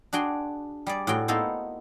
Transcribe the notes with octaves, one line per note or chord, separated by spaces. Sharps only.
D4 F#4 G#4 G5 C6
G3 G#4 D5
A2 F#4 G#4 G5
A#3 B3 D#4 E4 A4 C5